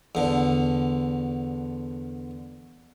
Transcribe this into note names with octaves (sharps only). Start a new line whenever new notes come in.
E2 D3